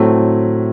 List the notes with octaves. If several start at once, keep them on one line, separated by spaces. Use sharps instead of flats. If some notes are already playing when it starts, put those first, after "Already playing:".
Already playing: A2 F#3 A3 C4